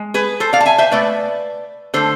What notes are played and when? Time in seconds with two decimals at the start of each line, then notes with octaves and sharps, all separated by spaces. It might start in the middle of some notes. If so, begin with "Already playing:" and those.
Already playing: G#3
0.14 G#4 B4
0.40 A4 C5
0.53 D5 F5
0.60 A5
0.66 E5 G#5
0.78 C5 E5
0.91 B2 A3 B4 D5
1.94 D3 A3 A4 C5